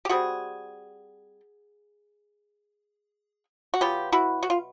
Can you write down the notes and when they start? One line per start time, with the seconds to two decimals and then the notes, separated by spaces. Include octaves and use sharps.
0.05 G4
0.09 D3 G3 C4 F#4 G#4
3.74 F#4
3.81 B2 F#3 B3 F4 G4
4.12 E4 F#4
4.43 F#4
4.50 F4